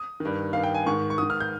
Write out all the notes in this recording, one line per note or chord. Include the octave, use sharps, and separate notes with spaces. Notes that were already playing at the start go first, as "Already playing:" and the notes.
Already playing: D#6
D#3
G2
G2 D#3 F5
G5
G#5
G#2 D#3 C#6
C#6
G#2 D#3 D#6
F6
G6